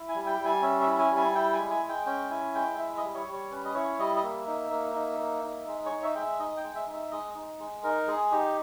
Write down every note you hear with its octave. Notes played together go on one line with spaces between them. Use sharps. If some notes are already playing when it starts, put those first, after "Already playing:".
Already playing: E4
G#5
G3
G5
G3
G#5
C#4 E5
E5
E4
G#5
G3
G#5
E4 G5
G#5
G#3
G#5
G#3
G5
C#4 G5
E4 G#5
G#3 G5
E4 E5
D#5
G3
C#5
G3
C#5
C#4 B4
D#5
E4 C#5
G3 D#5
D#5
A#3 E5
D#4
A#3
D#4
A#3
D#4
G#3
C#5
D#4
E5
G#3 G5
E5
D#4 D#5
G5
G#3
E5
D#4
E5
G#3 D#5
D#4
G#3
D#4 A#4
G#3 G#4
D#4 G4